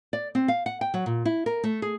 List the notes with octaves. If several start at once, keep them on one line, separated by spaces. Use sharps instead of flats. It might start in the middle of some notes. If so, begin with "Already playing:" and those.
D5
C4
F5
F#5
G5
F#3
A#2
E4
A#4
A3
G#4